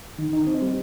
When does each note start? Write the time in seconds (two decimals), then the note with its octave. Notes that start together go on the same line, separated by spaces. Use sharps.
0.19 D#3
0.33 D#4
0.47 C4
0.62 G3